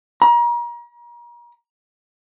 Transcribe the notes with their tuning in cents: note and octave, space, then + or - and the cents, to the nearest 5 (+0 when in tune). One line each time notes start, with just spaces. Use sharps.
A#5 +35